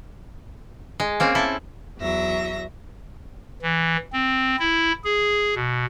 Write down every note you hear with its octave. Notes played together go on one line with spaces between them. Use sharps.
G#3
A#3 C4 C#4
E4 A4 A5
E2 F#3 E5 A#6
E3
C4
E4
G#4
B2